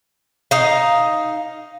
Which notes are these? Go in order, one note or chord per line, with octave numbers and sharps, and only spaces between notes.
D#4 F5